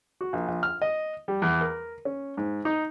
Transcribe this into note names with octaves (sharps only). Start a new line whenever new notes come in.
F#4
A#1
A#1
F6
D#5
G3
E2
A#4
C#4
G#2
D#4